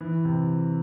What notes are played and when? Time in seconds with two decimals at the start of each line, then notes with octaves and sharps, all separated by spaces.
0.01 E3
0.25 C3